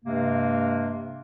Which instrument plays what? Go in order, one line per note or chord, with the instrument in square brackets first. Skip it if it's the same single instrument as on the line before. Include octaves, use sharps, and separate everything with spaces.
[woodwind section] G2 C3 G#3 A#3